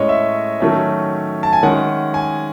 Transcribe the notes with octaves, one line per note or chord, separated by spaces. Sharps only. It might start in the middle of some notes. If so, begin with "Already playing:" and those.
Already playing: A2 G#3 C#4 C#5 D#5
E5
D#3 F#3 A3 C#4
A5
G#5
D#3 G#3 C#4 F#5
G#5